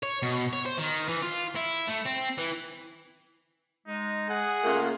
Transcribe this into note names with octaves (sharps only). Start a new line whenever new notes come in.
C#5
B2
C#5
C5
D#3
E3
F4
E4
A3
C4
E3
G#3 D#4
G#4 F#5
C#3 A3 A#3 F4